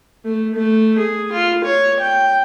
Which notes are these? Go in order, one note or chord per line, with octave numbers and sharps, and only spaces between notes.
A3
A3
G#4
F4
C#5
G5